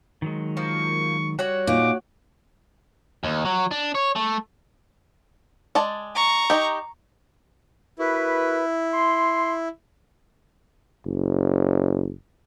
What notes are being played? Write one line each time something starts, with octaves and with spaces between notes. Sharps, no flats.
D#3 F#3 G#3
F3 A#3 C#6
G3 F#4 C#5 F#5
A#2 D#4 D6
D#2
F#3
D4
C#5
A3
G#3 D5 A5
A#5 C#6
D#4 G4
E4 F#4 A#4 B4
C6
F#1